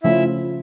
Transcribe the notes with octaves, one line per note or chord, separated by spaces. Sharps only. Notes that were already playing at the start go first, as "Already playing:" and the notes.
C#3 F3 A3 C#4 E4 F4 E5